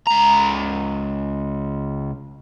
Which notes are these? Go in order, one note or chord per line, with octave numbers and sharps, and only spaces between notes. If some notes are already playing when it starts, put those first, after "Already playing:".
C#2 A#5